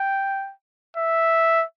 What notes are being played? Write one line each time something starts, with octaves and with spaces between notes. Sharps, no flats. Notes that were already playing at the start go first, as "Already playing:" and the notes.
Already playing: G5
E5